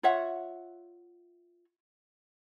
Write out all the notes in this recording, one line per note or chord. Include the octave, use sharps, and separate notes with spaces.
F4 C#5 E5 F#5